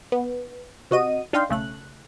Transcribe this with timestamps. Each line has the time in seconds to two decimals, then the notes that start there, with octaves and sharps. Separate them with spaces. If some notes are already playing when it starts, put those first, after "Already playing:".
0.12 B3
0.91 C3 F#4 D#5 D#7
1.33 D4 D#4 F5 G5 C6
1.49 B1 C#3 A3 F#6